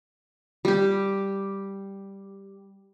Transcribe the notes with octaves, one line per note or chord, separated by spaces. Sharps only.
G3 G4